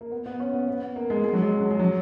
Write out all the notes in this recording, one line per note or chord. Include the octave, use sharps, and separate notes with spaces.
A#3
B3
B3
C#4
B3
B3
A#3
G#3
G#3
F#3
G#3
F#3
G#3
F#3